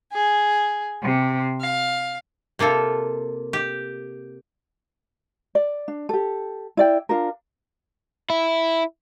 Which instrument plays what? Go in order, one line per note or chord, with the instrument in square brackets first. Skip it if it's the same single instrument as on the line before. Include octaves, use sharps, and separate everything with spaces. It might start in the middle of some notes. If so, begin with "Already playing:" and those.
[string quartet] G#4
C3
F5
[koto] C3 A#3 F4 A4
G4
[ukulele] D5
D4
G4 A4
E4 D5 G5
D4 F4 A#4
[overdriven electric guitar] E4